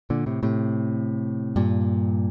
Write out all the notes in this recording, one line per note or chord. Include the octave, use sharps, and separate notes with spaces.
A#2 D3
A2 C3
A2 C3
G2 A#2